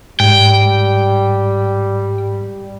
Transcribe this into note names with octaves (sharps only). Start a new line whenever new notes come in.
G#2 G3 G5